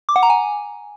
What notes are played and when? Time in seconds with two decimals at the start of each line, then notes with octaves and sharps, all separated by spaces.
0.09 D6
0.16 F#5
0.23 A#5
0.30 G#5